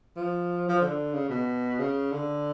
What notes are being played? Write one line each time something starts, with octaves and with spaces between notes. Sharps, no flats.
F3
F3
D3
C#3
B2
C#3
D3